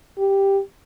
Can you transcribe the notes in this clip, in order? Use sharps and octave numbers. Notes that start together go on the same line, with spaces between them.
G4